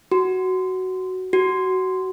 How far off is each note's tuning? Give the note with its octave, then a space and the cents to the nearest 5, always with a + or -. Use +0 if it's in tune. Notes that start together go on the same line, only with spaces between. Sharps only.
F#4 +10
F#4 +15